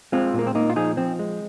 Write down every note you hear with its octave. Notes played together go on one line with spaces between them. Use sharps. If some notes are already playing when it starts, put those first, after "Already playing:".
G#3 C4 F4
A#2 A#3
C4
A#2 A#3 D#4
F4
F3 D#4 G#4
F3 C4
G#3